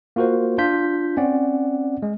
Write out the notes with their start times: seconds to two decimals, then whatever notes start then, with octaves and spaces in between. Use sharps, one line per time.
0.16 A#3 F4 F#4 A#4 C5
0.58 D4 F4 G6 B6
1.17 C4 C#4 D5 F#5
2.02 G#3